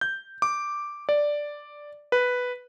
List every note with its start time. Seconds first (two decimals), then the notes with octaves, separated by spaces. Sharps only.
0.01 G6
0.42 D6
1.09 D5
2.12 B4